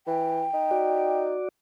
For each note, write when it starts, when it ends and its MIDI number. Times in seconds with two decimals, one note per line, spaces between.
0.07 0.45 52
0.07 1.19 79
0.54 1.35 63
0.71 1.49 66
0.71 1.49 74